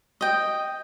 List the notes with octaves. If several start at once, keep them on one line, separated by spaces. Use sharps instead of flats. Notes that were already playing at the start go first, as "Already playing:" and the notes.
D#5 G5